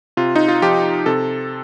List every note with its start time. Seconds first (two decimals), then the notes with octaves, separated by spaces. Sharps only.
0.17 C3 F4
0.36 D#4
0.48 F4
0.62 F3 G4
1.06 C3 A4